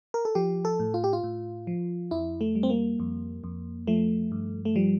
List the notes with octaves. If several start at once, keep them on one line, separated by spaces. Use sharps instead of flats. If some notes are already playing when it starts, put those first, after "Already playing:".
A#4
A4
F3 G4
A4
A2
F4
G4
F4
A2
F3
F2 E4
A3
G3
C4
A#3
F2
F2
F3 A3
G2
A3
F3 G3